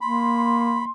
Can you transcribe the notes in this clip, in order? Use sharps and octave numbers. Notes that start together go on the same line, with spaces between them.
A#3 B5 C6